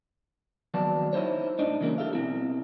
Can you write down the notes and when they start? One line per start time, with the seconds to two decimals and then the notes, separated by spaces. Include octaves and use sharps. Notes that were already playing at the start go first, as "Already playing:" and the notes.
0.74 D#2 F3 F#3 B3 D5 A5
1.13 D#4 E4 C5 C#5
1.59 A2 D4 D#4
1.81 C#3 E3 A#3 C#4
1.98 G4 A4 E5 F5
2.13 B2 C4 E4